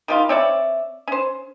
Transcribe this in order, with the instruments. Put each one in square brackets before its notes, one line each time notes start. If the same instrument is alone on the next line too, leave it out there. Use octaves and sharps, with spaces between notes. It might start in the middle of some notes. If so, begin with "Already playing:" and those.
[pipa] D#3 G3 F4
C4 C#5 D5 E5
C#4 C5